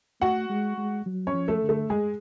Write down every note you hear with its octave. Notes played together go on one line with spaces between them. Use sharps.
A3 F#4 F#5
G#3
G#3
F#3
C#4 C#5
F3
A3 A4
D3
A3 A4
G#3 G#4